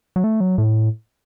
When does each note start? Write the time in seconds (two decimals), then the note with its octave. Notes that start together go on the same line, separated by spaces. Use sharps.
0.16 F#3
0.24 A3
0.40 F#3
0.58 A2